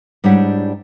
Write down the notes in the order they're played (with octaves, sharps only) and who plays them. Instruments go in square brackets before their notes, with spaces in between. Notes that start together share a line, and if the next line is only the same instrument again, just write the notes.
[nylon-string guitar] G#2 G3 D4 E4 C#5 F#5